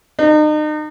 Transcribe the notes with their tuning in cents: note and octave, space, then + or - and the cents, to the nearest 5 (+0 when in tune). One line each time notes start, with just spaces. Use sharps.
D#4 -35